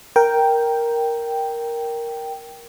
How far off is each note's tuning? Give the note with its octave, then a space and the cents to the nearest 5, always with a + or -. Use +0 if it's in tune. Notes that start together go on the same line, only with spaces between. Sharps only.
A#4 +5 G5 +0